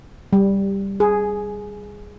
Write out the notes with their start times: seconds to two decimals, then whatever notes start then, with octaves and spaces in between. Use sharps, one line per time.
0.33 G3
1.00 G#4